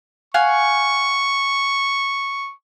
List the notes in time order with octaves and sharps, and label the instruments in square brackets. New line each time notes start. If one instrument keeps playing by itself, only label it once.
[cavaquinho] F5 F#5 G#5 [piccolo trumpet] C#6